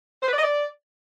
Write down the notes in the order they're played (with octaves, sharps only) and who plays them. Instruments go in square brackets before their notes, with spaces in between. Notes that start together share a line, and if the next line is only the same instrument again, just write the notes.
[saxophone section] C5
B4
D5
D#5
D5